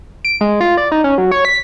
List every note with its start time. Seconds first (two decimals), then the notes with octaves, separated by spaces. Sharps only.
0.25 D7
0.41 G#3
0.61 F4
0.78 D5
0.92 D#4
1.04 C#4
1.18 F#3
1.31 C#5
1.45 B6